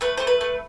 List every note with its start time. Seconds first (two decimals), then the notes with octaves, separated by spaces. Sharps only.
0.01 A3 B4
0.17 A3 C5
0.27 B4
0.41 A3